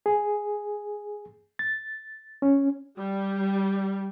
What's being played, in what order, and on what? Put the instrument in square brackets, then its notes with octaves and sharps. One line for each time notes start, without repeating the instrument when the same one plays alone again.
[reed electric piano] G#4
A6
C#4
[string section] G3